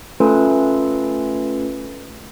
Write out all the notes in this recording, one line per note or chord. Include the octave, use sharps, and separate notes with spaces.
A3 C#4 F4 A4 B4